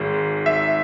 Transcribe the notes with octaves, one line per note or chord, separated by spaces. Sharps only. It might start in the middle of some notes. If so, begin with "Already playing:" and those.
Already playing: G#1 G#2
E5